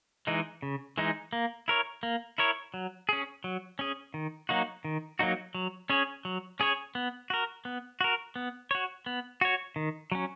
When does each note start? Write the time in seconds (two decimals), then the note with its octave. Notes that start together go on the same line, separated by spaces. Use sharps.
0.27 E3 G#3 D#4
0.62 C#3
0.98 E3 G#3 D#4
1.33 A#3
1.68 E4 A#4 C#5
2.03 A#3
2.38 E4 A#4 C#5
2.74 F#3
3.09 C#4 G#4
3.44 F#3
3.79 C#4 G#4
4.14 D#3
4.49 F#3 A#3 D#4 F#4
4.85 D#3
5.19 F#3 A#3 D#4 F#4
5.55 F#3
5.90 C#4 G#4 C#5
6.25 F#3
6.60 C#4 G#4 C#5
6.95 B3
7.30 F#4 A#4
7.65 B3
8.01 F#4 A#4
8.36 B3
8.71 F#4 C#5
9.06 B3
9.41 F#4 C#5
9.76 D#3
10.12 F#3 C#4